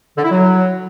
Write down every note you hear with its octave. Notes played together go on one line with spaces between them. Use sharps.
D3
E4
F#3